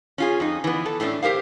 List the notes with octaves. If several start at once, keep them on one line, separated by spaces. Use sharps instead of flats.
C#4 F4 G#4
F2 D#4
E3 B3
A4
A2 A3 C#4 D4
G4 A#4 C5 F5